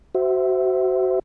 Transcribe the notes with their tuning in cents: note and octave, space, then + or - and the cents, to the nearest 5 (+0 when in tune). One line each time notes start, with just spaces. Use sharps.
F#4 +25 C5 -20 E5 +0